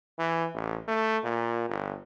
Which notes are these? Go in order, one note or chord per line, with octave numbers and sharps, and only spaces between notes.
E3
A1
A3
A#2
G1